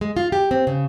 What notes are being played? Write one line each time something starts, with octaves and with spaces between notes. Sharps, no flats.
G#3
F4
G4
C4
C#3